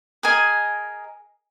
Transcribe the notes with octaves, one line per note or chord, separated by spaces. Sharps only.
G#4 A#4 D#5 G#5